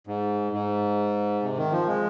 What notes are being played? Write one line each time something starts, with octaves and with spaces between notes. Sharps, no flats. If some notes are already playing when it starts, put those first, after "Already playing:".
G#2
G#2
C3
D#3
F3
G#3